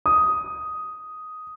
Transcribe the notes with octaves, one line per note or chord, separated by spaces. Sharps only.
D#6